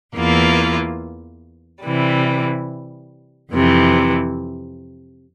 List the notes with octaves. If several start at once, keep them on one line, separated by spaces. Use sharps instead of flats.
E2 E3 A#3 F4
C3 E3 G3
F2 C3 E3